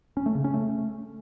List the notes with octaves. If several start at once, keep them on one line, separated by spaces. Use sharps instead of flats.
C#4
A3
C#3
C#4
A3